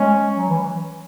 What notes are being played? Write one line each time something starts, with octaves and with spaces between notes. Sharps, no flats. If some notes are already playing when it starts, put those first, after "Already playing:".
Already playing: G#3 C#4
F#3
E3